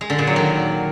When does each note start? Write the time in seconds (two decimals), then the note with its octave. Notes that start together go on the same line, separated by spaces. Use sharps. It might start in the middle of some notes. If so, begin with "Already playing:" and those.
0.01 G#3
0.10 D3
0.18 A#2
0.27 F#3
0.36 D#3